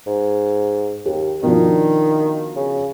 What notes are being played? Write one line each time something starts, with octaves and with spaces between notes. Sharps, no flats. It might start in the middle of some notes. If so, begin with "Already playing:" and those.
G#2
D#2 G4
B2 D#3 F3 D4
C#3